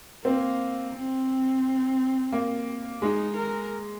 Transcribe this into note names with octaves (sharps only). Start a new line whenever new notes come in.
A#3 C4
C4
A#3
G#3 D#4
A#4